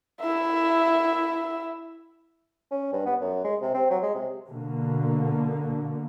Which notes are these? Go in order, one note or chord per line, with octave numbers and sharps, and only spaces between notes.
E4 E5
C#4
G2
B3
F#2
G#3
C3
C4
F#3
G#3
C3
B2 D3 A#3